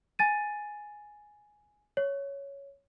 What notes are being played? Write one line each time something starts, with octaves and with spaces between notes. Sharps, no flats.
G#5 A6 D#7
C#5